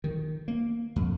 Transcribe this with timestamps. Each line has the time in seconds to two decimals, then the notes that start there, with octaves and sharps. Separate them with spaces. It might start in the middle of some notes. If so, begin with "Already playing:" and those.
0.04 D#3
0.48 A#3
0.96 F2